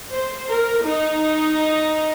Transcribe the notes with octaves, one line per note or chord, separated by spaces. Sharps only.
C5
A#4
D#4